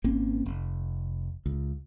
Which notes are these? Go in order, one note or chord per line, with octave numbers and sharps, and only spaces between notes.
G#1 A#3 C4 C#4
F1
C#2